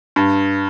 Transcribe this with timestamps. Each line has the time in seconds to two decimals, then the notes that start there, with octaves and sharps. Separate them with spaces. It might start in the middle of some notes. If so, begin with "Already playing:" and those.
0.16 G2